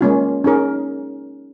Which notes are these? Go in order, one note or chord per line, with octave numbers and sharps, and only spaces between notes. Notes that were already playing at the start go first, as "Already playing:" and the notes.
G#3 A#3 C#4 F4
C#4 D#4 G#4 A#4